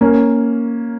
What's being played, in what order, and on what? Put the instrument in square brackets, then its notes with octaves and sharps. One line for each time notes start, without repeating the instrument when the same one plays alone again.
[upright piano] A#3 C#4